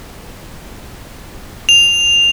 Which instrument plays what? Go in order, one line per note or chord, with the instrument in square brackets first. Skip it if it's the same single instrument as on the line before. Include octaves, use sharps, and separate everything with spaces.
[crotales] F7